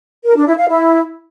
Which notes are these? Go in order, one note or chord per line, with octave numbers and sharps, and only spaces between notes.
A#4
D4
E4
F5
E4